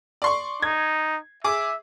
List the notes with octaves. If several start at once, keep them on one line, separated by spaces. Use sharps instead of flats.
D5 C6 C#6
D#4 G#6
G#4 E5 D6